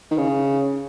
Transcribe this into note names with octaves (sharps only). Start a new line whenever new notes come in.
D#3
C#3